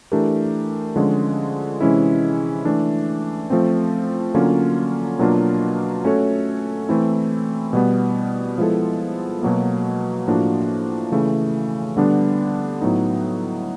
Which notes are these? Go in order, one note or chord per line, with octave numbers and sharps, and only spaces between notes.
E3 A3 D4 G4 A#4
D3 F3 G#3 C#4
C3 E3 G#3 C#4 E4
E3 A3 D4
F3 A3 C4
D3 F#3 A#3 C#4 F4
B2 F#3 A#3 D4 F4
A3 C#4 F#4 A4 C#5
E3 A3 C4 E4
B2 G3 B3
F3 G#3 B3 E4 A4
B2 F#3 A#3
A2 F3 A#3 D4 F#4
C#3 E3 A3
D3 G3 B3 D4
A2 F#3 B3 D#4